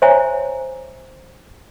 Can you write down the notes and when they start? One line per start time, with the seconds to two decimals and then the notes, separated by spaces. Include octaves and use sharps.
0.02 C5 C#5 E5 G#5 A#5